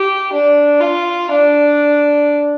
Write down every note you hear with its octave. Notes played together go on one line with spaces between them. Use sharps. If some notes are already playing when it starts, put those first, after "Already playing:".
Already playing: G4
D4
F4
D4